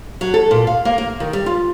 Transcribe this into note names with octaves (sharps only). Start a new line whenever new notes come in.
F#3
A4
A#2
F5
A#3
A#3
D#3
G3
F4